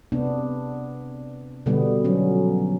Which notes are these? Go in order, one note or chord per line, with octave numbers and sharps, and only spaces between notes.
C3 B3 D4
B2 D3 G3 B3 G4
F3 F#3 C#4